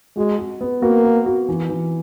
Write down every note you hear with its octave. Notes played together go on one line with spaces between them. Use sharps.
G#3 F#4
F#4
B3
A#3 F#4
B3
F#4
E3
E3